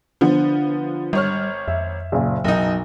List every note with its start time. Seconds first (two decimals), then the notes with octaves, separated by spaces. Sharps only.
0.21 D3 F3 B3 D4 C5
1.13 G#1 G3 C#5 F6
1.68 F2 E5
2.12 F#1 A#2
2.44 F#1 B1 F#3 D#4